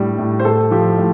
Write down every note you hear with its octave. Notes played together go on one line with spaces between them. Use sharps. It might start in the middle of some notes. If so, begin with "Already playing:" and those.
Already playing: A2 G3 D4
A2
C5
A2 A4
F3 G4
A2